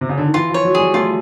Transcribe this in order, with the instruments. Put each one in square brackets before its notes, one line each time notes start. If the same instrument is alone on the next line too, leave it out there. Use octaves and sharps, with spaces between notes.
[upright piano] C3
C#3
D3
D#3
[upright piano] E3 [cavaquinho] F4
[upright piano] F3 [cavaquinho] C#5
[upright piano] F#3
[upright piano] G3 [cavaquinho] G#4
[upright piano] A3 [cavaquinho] F4